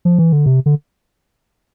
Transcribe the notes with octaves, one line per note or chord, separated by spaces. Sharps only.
F3
E3
D3
C3
D3